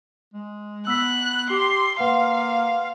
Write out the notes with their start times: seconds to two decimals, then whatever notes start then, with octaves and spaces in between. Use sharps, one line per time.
0.34 G#3
0.87 B3 E6 F#6 B6
1.50 G4 C6
2.00 A#3 B4 F5 F#5 C6